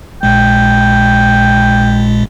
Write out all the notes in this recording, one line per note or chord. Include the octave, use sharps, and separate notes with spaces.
A#1 A#2 G#3 G5